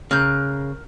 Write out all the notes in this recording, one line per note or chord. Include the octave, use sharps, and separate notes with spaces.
C#3 A#4 F#6 G6